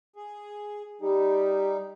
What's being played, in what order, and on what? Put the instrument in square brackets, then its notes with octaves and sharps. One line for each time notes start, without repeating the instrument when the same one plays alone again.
[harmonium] G#4
[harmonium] G3 D#4 [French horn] G4